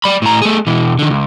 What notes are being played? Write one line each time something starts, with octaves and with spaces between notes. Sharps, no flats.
D5 B5
A2 A#5
A3 G#4
B2 E3
D3 D#3
C#2